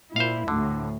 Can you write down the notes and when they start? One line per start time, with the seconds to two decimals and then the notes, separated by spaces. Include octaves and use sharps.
0.16 A#2 E4 C5 F5
0.48 D2 A2 D3